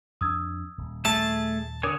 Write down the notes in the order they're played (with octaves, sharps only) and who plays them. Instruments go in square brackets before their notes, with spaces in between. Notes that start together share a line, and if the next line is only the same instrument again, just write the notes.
[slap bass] F2 D4 [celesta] D#6 E6 G#6
[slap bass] D#1
[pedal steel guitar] A3 G#4 E5 [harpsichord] A5
[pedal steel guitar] D3 C#5 G#5 [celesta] A#4 D6 D#6